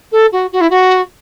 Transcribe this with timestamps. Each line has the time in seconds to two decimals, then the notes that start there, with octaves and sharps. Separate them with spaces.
0.12 A4
0.32 F#4
0.52 F#4
0.61 E4
0.70 F#4